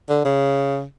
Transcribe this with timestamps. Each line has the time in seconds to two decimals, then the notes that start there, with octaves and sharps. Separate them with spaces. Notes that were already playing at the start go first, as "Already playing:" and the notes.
0.09 D3
0.25 C#3